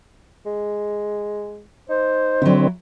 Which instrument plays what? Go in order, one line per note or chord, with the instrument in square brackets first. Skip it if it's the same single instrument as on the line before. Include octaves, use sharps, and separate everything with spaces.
[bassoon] G#3
[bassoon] D#4 [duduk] C5
[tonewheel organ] D3 C4 [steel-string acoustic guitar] F#3 E4